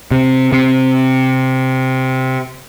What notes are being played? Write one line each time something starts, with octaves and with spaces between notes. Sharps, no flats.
C3
C3